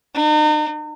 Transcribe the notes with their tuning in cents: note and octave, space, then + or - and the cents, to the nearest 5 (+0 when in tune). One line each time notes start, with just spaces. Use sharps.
D#4 -40